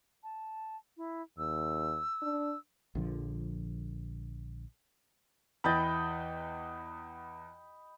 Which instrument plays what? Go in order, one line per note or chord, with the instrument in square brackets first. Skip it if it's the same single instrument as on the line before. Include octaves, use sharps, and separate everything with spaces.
[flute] A5
E4
[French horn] D#2 [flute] E6
[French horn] D4
[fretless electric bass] A#1 D3 F3
[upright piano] E2 E3 A6 [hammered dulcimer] D#5 G5 B5